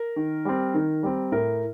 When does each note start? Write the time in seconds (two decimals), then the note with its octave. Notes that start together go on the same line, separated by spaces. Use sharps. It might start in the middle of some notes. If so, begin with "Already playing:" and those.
Already playing: A#4
0.16 D#3
0.45 G3 C4
0.74 D#3
1.03 G3 C4
1.32 A2 A#4